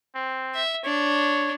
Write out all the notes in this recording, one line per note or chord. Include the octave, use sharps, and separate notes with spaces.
C4
E5
D4 C#5